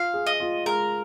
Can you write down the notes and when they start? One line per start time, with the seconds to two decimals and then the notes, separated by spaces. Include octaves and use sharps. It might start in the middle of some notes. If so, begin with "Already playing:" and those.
Already playing: F4 F5
0.14 G#4
0.27 D#5
0.40 F4
0.66 G#3 A#4